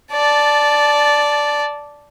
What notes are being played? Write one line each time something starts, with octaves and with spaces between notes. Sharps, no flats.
D5 A5